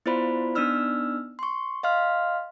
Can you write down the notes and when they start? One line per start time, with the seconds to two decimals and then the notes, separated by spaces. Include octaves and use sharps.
0.06 B3 E4 F4 C5 D5 B5
0.55 B3 D4 D#4 D5 E6 F6
1.39 C6 C#6
1.83 D#5 F5 C6 F6